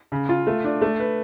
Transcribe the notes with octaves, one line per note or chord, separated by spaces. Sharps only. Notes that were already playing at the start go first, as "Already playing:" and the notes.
C#3
F4
A3
D4
A3
B4